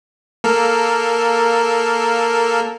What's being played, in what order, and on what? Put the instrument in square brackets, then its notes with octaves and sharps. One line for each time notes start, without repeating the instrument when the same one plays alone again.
[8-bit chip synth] A#3 A4 A#4